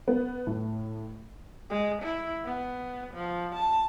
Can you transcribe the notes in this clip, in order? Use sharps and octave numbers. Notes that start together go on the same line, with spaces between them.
B3
A2
G#3
E4
B3
F3
A5